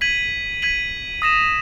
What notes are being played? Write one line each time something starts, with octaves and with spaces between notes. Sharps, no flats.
G#6 B6 D#7 F#7
G#6 B6 D#7 F#7
D#6 A#6 E7